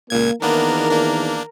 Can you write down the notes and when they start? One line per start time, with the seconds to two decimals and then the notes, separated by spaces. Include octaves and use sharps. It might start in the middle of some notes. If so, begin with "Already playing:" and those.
0.10 C#2 A#2 A#3 G#6
0.42 E2 D#3 A#3 B3 D4 A#4
0.90 A#3 D4